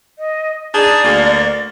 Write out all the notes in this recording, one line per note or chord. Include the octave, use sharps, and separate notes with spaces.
D#5
D4 D#4 G#4 D5
D2 A#3